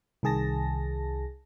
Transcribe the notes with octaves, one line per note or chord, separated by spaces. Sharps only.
C2 D#3 G#4 A5 A#6